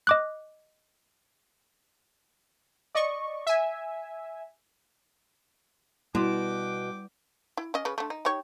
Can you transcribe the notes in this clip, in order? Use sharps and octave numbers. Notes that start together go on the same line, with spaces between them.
D#5 D6 F#6
D5 D#5 C#6
E5 G#5
B2 G3 E4 G5 C6 D6
E4
C#4 D#5
C#3 B4
D3 A3
D#4
D#4 G4 C#5